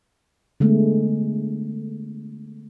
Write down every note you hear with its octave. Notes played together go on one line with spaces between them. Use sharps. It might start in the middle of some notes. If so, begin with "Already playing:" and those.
D3 G#3 A3 B3